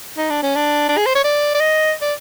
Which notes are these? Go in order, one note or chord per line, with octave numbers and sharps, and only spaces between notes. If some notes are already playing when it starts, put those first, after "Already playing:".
D#4
D4
C#4
D4
D4
G#4
C5
C#5
D5
D5
D#5
D5